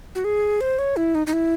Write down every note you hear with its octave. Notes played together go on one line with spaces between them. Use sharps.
F#4
G#4
C5
C#5
E4
D#4
D#4
E4